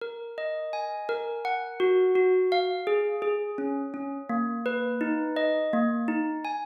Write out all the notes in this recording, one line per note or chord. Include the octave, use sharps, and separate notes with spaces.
A#4
D#5
G#5
A#4
F#5
F#4
F#4
F5
G#4
G#4
C#4
C#4
A#3
B4
D#4
D#5
A#3
D#4
G#5